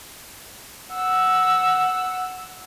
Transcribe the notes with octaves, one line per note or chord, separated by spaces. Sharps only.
F#5 E6